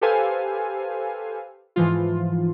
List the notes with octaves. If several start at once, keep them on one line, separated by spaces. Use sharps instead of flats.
G4 A4 B4 C5 F5 G#5
G#2 E3 F3 F4